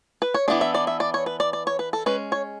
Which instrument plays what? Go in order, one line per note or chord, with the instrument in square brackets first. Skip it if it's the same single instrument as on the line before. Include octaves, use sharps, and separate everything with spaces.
[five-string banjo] B4
C#5
E3 B3 D4 D5
E5
D5
E5
D5
C#5
B4
D5
D5
C#5
B4
A4
G#3 C#4 B4
C#5